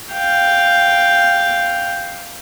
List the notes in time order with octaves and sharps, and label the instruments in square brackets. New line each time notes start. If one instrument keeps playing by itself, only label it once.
[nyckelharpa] F5 G5